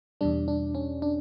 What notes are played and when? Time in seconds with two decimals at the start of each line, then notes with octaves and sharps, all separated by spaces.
0.21 E2 B2 G3 D4
0.48 D4
0.75 C#4
1.02 D4